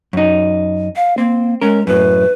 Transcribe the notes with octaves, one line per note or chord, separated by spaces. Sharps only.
F#2 D#4
F5
A#3 C4
G#3 C#4 A#4
F#2 A2 B4